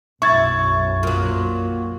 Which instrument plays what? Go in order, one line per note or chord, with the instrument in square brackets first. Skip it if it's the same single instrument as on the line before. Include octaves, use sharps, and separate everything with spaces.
[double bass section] B1 F#2 [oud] E4 [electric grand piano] C#6 G#6 A6
[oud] A#2 F#3